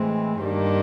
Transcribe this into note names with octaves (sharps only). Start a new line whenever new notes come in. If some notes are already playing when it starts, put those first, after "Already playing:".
Already playing: A2 E3 G#3 C4
G2 D#3 G3 A#3 D4